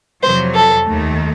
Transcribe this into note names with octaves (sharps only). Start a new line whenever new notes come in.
F2 C3 F#3 C5
A4
D#2 D#3 A3